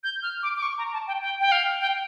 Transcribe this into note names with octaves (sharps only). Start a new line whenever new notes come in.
G6
F6
D6
D6
C#6
A#5
A5
G5
G5
G5
F5
G5